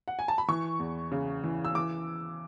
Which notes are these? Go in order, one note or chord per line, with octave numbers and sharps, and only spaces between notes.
F#5
G#5
A5
B5
E3 C#6
E2
C#3
E3
E6
E3 D6